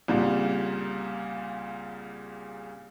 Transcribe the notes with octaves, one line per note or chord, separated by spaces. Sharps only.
C2 A#2 C#3